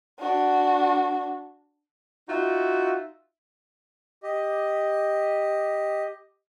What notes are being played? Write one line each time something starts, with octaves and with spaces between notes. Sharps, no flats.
D4 F#4
D#4 F4 F#4 E5
G4 D#5